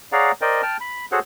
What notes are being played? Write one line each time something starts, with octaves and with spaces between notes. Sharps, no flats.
G#4 C#5 D5 F5 F#5 A#5
A#4 C5 D5 D#5 G5
G5 A5 F6
B5
F#4 G#4 A4 C5 C#5 F#5